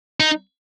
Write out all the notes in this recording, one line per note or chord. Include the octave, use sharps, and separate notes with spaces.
D#4